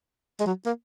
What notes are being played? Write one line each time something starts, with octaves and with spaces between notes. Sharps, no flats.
G#3
F#3
A#3